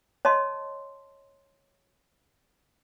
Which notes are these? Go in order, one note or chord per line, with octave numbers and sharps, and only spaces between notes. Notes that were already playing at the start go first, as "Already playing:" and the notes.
C#5 D#5 A5 C6